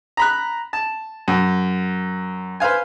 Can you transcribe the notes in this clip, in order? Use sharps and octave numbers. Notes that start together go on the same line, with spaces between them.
A#5 B5 F#6
A5
F#2
B4 C5 F5 G#5